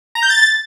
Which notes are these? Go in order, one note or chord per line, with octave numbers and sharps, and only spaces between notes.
A#5
G6
A6